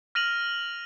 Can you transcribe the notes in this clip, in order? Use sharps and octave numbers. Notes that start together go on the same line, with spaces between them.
F6 A#6 D#7 F7 F#7